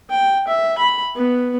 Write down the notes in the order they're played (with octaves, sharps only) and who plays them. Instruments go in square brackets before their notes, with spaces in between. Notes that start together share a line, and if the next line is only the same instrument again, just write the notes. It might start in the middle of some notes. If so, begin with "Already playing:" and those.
[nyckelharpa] G5
E5
B5
B3